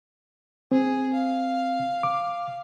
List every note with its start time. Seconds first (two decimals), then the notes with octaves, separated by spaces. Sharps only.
0.72 C4 G#4
1.14 F5
2.03 D6